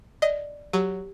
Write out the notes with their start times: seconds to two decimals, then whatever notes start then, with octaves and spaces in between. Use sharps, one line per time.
0.22 D5 D#5
0.73 F#3 G4